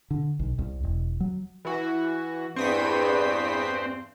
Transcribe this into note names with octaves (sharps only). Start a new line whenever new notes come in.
D3
B1
C2
E1
F#3
E3 F#4
E2 G2 C4 C#6 D#6 B6